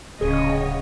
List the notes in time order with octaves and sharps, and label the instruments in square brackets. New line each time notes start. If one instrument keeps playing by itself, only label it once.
[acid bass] D1 [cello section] C#3 C#5 D#5 [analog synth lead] G#4